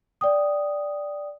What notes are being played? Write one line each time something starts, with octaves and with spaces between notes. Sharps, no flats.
D5 G5 D#6